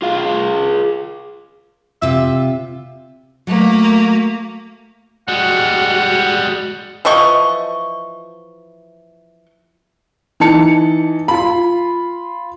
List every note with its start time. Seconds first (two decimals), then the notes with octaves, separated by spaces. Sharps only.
0.02 F4 G#4 F5
2.02 C3 F4 E5
3.47 F#3 A3 A#3
5.28 G3 G#3 F#4 F#5
7.05 E3 F3 D#5 C#6
10.40 E3 D#4 A5 C#7
11.28 F4 B5